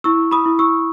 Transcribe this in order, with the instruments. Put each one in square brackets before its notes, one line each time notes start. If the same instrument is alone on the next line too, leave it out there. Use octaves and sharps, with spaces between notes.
[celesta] E4 C#6 E6
B5 D#6
E4
C#6 E6